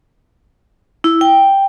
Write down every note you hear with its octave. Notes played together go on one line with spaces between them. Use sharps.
E4
G5